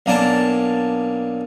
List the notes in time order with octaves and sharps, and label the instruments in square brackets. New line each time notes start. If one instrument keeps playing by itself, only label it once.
[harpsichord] B1 A#3 D4 G#5 A5